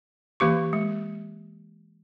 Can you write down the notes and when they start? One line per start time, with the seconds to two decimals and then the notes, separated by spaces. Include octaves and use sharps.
0.40 E3 A#3 G4 C#6
0.73 G#3